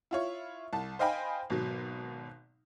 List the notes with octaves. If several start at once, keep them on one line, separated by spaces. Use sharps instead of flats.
E4 F4 C#5
C2 A5
C5 D#5 F5 G5 G#5 B5
G#1 B2 F#3